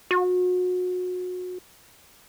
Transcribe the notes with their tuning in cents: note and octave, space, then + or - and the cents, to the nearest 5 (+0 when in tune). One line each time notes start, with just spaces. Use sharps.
F#4 -30